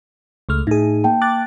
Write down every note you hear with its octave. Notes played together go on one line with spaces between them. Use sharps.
C#2 A3 F6
A2 D#4 G#4
A#3 G5 A5
D6 F#6 A6